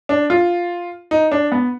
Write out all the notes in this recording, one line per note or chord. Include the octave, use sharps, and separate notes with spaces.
D4
F4
D#4
D4
B3